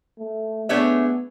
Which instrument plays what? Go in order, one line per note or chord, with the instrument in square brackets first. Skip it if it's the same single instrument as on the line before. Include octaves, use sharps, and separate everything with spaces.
[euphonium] A3
[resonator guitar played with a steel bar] A3 D4 G#4 C#5 E5 [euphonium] B3